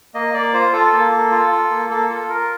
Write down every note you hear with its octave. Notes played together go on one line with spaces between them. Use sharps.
A#3 D#5
A#3 D5
F4 C5
F4 A4
A#3
A#3
F4
F4
A#3
A#3 A4
F4 A4
F4 A#4